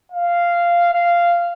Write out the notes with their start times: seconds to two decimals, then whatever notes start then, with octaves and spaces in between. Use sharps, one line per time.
0.12 F5
0.93 F5